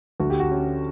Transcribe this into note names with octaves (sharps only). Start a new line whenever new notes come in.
D2 F#4
G4
F#4
C#4 G4